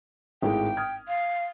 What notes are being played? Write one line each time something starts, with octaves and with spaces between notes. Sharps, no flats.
G#1 A2 G#3 G5
D#6 F6 G#6
F5